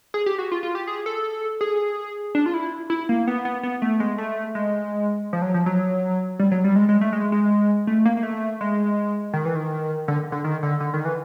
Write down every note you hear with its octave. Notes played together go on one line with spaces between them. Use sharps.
G#4
G4
F#4
F4
F4
G4
G#4
A4
G#4
D4
F4
E4
E4
A#3
B3
B3
B3
A3
G#3
A3
G#3
F3
F#3
F3
F#3
G3
F#3
G3
G#3
G#3
A3
G#3
G#3
A3
A#3
A#3
A3
G#3
D#3
E3
D#3
D3
D3
D#3
D3
D3
D#3
E3